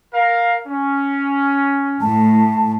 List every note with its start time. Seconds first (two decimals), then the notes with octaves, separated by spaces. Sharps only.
0.14 A#4 F5
0.67 C#4
2.01 A2 A5